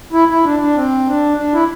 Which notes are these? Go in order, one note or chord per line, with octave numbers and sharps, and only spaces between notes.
E4
E4
D4
D4
C4
D4
D4
E4